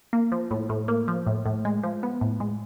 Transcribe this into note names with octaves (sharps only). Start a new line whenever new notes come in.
A#3
F3
A2
A2
A#3
F3
A2
A2
G#3
F3
B3
A2
G#3